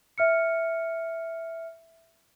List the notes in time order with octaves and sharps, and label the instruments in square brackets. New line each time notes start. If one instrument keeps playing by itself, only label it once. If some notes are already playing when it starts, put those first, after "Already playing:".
[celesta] E5 F6 C#7